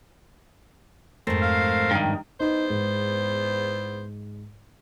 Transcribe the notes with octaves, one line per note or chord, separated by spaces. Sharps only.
F2 G#2 A3 A#4 C5
F5
G2 D#3
E2 B3 D#4 C5
G#2